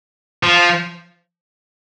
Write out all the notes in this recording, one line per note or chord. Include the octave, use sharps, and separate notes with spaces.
F3